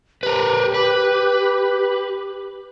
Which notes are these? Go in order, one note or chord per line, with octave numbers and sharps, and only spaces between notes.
G4 A#4 B4
B4